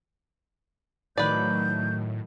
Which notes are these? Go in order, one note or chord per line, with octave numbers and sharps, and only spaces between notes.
A2 D#3 F#3 A3 B4 D5 G6